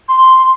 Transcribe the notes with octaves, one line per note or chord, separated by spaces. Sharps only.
C6